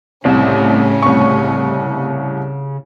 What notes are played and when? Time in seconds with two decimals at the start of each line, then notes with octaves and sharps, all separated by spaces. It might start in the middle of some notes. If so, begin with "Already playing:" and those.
0.25 C2 A2 C#3 C#4 A5
1.02 C2 C#6